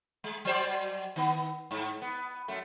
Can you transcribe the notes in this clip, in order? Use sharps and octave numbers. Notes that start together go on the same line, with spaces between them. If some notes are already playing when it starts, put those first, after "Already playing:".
G#3
F#3 C5 D5
D#3 B3
G#2
B3
F#2 A3